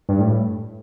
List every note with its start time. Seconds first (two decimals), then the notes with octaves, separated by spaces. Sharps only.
0.09 G2
0.20 A2